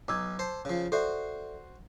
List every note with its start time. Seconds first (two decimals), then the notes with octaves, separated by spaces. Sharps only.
0.08 B1 D#4 D6 E6 G#6
0.39 C5 A5
0.65 C#3 F3
0.92 F#4 A4 C5 D5 E5